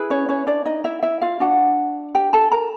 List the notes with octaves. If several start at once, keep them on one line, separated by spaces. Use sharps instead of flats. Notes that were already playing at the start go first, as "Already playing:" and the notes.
Already playing: E4 G#4 B4
C#4 C#5
C#4 C#5
D4 D5
D#4 D#5
E4 E5
E4 E5
F4 F5
D4 F#4 F#5
G4 G5
A4 A5
A#4 A#5